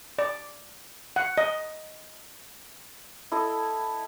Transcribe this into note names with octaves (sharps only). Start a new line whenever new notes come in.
D5
F#5
D#5
E4 A4 D#5